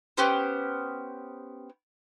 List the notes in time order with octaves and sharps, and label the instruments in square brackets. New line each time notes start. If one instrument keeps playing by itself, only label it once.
[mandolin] B3 C#4 G4 C5